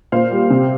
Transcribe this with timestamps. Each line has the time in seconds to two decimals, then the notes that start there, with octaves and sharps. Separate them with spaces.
0.12 A#2 C5 F5
0.31 G3
0.50 C3